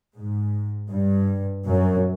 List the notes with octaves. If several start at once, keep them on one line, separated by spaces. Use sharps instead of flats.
G#2
G2
F#2